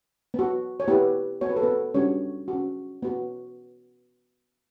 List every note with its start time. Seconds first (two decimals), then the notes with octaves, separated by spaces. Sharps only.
0.34 B3 F#4
0.80 C#5
0.88 B3 E4 G4 B4
1.41 B3 F#4 C#5
1.49 B4
1.56 A4
1.63 B3 B4
1.94 G3 C#4 D4 F#4 C#5
2.48 F#4
2.53 C#4
3.03 B3 F#4